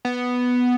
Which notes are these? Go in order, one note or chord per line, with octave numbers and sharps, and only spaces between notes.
B3